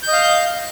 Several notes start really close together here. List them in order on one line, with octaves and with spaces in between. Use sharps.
G6 D#5 F5